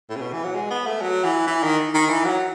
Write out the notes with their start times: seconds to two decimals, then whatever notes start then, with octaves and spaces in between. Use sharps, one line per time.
0.10 A2
0.16 C#3
0.21 B2
0.33 E3
0.44 F#3
0.55 G#3
0.70 B3
0.87 A3
1.02 F#3
1.24 E3
1.47 E3
1.63 D#3
1.95 D#3
2.09 E3
2.25 F#3